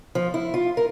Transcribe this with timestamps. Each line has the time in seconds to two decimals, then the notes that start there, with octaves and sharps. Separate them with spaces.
0.15 F3
0.34 E4
0.54 F4
0.77 A#4